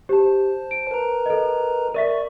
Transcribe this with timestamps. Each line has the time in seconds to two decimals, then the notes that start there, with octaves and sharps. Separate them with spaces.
0.09 G4 C5 A5
0.71 D7
0.91 A#4 B4 A#5
1.26 A4 D#5
1.94 A#4 D5 E5 C#6 B6